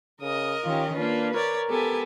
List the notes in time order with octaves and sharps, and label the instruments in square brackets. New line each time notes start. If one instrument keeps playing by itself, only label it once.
[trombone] C#3 [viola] A#4 D#5 [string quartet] D#6
[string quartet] D#3 C#4 G4 [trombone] F4
[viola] A#3 F4 [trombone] D4 [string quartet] B4
[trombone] A#4 [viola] C#5 D5
[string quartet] B3 A4 G#5 [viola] G4